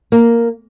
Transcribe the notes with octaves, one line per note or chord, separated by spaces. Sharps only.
A#3